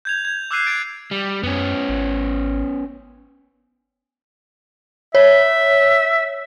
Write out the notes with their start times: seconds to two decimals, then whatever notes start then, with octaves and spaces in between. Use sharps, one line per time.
0.05 G6 G#6 F7
0.25 G6 G#6
0.51 D6 E6 F#6 G6 C7 D#7
0.66 G#6 A6 D7
1.11 G3
1.43 F#2 B3 C#4
1.89 G#1
5.15 C#5 E5